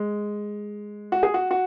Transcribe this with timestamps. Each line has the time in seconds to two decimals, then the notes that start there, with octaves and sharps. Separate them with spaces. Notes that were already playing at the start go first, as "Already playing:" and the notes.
Already playing: G#3
1.12 F#4
1.23 G#4
1.34 F#4
1.51 F#4